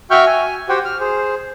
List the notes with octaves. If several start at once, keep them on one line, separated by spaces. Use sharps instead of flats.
F#4 E5 G5 C#6 F6 G6
G#5
F#4 G4 C5 F#5 G5
F6
G#4 C5